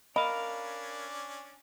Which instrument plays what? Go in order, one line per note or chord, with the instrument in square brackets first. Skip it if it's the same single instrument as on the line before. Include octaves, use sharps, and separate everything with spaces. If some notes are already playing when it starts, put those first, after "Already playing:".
[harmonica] C#4 D4 [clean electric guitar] A#4 F5 [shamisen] D#5 [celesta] B5